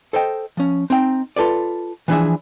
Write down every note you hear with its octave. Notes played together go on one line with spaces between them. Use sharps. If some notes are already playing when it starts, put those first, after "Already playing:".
A4 C5 D#5 G5
F3 C#4
C4 D#4 G5
F4 A4 B4 D5
E3 F3 D4 E4 G#4 E5